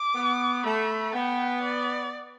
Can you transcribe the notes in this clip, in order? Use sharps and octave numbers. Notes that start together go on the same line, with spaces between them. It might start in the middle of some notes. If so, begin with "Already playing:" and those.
Already playing: D6
B3
A3 B5
B3 G5
D5